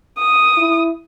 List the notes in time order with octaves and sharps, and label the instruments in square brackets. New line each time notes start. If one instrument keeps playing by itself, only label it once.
[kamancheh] D#6
[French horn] E4